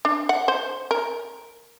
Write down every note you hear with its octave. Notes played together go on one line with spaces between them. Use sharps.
D4
F#5
C5
A#4